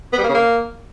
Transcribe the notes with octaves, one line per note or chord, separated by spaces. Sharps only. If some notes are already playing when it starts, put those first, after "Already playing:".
B3
G3
A#3
C#3
A#3